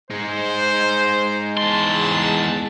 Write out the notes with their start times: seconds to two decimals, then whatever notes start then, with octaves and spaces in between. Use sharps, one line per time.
0.10 G#3 D#4 C5
1.57 E2 A5 C6